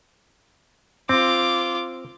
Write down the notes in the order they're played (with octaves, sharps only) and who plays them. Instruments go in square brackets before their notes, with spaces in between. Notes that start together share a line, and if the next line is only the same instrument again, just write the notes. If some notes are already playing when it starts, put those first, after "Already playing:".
[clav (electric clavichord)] C4 [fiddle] F4 D6